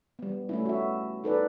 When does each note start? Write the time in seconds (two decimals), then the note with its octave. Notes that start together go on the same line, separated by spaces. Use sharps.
0.19 G3 B3
0.49 A3 C#4 E4
0.66 F#4 E5
1.24 D#4 A4 B4 D5